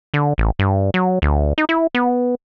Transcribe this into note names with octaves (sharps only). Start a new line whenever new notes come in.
D3
A1
G2
F#3
D2
D#4
E4
B3